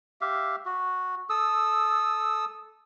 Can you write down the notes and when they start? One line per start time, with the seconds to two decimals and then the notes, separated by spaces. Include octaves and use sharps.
0.21 G4 E5 F5
0.66 F#4
1.30 A4 D#6 E6